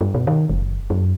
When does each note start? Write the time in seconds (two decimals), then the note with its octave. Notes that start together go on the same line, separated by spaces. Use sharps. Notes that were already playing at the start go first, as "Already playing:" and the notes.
0.01 G2
0.15 B2
0.27 D#3
0.50 F#1
0.90 F#2